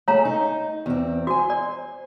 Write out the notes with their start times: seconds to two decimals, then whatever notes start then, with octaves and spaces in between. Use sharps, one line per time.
0.08 G#3 A3 G#4 C#5 F5 A#5
0.25 D#4
0.86 E2 C4
1.27 F#4 C5 G#5
1.50 D5